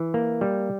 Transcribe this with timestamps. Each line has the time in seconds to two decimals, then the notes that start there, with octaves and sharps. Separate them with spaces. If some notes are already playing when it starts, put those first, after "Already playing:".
Already playing: E3
0.14 A#3
0.41 G3